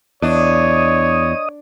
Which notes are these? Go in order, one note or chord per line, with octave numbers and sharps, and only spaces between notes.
E2 D4 C#5 D#5 D#6